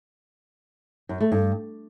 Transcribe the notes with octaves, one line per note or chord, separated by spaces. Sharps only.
F#2
A3
G2